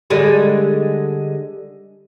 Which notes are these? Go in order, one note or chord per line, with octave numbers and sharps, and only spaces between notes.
D3 G3 G#3